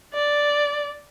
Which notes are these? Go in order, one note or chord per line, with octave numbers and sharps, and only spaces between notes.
D5